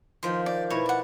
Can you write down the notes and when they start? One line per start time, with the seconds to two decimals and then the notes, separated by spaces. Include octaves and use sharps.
0.23 D#3 F3 C6
0.46 D5
0.70 B2 E4 C#5
0.86 D5 F#5